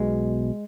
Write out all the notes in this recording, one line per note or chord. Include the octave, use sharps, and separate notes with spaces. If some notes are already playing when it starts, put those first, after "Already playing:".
Already playing: B1 B2 G#3